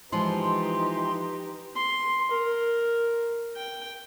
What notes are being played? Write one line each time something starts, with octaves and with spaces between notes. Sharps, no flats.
E3 F3 G#3 D#4 G4 B4 C6
C6
A#4
G5